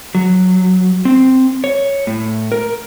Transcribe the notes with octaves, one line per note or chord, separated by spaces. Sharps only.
F#3
C4
C#5
A2
A#4